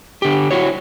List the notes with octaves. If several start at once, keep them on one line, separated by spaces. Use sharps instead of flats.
D3 G4
E4 F#4 C#5